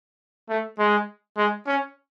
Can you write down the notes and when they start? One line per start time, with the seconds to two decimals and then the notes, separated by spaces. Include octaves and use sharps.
0.49 A3
0.79 G#3
1.37 G#3
1.67 C#4